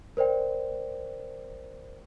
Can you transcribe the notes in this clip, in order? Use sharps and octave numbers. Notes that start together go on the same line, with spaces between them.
A#4 C5 D5 G5